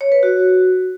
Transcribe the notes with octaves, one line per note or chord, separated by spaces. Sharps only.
C#5
B4
F#4